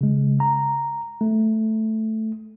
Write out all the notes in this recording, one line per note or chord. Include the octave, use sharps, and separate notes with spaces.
C#3 G#3
A#5
A3